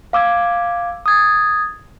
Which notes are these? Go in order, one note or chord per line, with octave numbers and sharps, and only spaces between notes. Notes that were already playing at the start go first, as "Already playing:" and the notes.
F5 D6 E6 G#6
D#6 G#6 A6